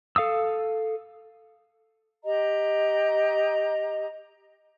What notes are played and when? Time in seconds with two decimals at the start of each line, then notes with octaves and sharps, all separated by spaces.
0.16 A4 F5 D#6 E6
2.22 G4 D#5 A#5